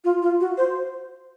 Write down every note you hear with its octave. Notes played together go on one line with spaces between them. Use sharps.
F4
F4
F#4
C5